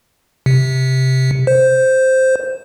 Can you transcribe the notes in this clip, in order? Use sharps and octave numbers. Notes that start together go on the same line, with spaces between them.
C3
C5